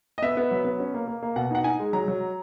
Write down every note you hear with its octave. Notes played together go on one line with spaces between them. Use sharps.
D#5
B3 E5
B3
F#3
B3
C#4
A#3
A#3
A#3
B2 F#5
D#4 F#5
D#4 G#5
G#3
F#3 A#5
F#3